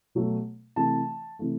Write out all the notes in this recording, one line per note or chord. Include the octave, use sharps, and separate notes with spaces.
B2 F#3 A3
C3 E3 A3 A5
C3 E3 A3